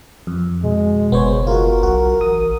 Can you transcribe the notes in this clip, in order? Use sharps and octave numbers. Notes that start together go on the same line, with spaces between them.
F2
B2 G#3
F#1 B3 C5 C#5
F4 F#4 A#4
B1 F#4
A1 D#6